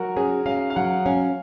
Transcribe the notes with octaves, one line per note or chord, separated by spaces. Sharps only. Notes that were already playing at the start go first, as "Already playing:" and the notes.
Already playing: F#3 F#4 A#4
C#4 G#4
C#4 F5
F5
F#3 F#5
C#4 F5